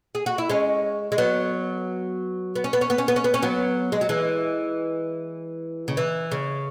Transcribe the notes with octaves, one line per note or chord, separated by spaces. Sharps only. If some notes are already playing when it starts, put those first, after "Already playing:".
G#4
F#4
E4
G#3 C#4
G#3
F#3 B3
B3
C#4
B3
C#4
B3
C#4
B3
C#4
B3
C#4
F#3 B3
G#3
F#3
E3 G#3
C#3
E3
C#3